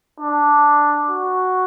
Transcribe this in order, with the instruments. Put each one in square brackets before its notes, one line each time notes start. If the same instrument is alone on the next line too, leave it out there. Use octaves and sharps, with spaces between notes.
[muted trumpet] D4
F#4